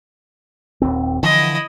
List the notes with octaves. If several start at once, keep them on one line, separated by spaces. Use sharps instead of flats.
D#1 D#2 C4
D3 E3 F3 E4 D#5